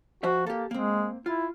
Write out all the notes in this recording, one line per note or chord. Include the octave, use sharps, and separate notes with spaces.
F3 F#4 C5 E5
A#3 G4 A4
G#3 A#3 C4
E4 F4